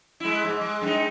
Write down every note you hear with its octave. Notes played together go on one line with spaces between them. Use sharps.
G#3 E4
G#2
G#3
F#2 G#3 D#4